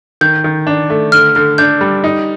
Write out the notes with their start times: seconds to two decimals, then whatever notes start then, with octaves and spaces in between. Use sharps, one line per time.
0.21 D#3 G6
0.44 D#3
0.67 D4
0.90 A3
1.12 D3 F6
1.35 D3 F6
1.58 D4 G6
1.81 G3
2.04 D#4